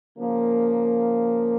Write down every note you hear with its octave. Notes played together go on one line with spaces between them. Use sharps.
C#3 F3 A#3